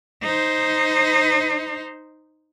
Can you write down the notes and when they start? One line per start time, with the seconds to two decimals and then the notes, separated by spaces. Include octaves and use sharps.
0.23 D#4 C5